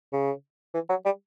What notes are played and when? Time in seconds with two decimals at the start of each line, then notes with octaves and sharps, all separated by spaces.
0.12 C#3
0.74 E3
0.90 F#3
1.05 G3